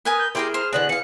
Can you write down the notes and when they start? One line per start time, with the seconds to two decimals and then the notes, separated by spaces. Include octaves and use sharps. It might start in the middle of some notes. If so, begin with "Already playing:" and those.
0.05 A#4 B4 G#5 D#6
0.19 G6
0.35 E4 G4 G#4 A#4 G5 A#5 C6
0.54 C5 F6
0.73 B2 D3 E3 F#6
0.89 E3 F5 C#7